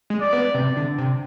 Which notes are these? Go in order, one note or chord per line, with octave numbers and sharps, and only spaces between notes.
G#3
D5
B3
C3
D3
C3